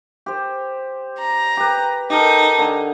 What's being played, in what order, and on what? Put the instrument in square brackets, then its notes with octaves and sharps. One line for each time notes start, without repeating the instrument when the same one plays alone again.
[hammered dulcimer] G4 C5
[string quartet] A#5
[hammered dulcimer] G4 B4
[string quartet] D#4 A4 [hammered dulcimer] G4 A#4
[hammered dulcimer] D3 G#5 A#5